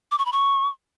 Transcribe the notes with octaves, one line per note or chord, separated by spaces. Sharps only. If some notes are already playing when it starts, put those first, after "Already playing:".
D6
C#6
B5
C#6